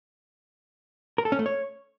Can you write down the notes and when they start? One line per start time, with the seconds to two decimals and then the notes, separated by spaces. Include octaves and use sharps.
1.18 A#4
1.25 A4
1.32 C#4
1.39 A3
1.46 C#5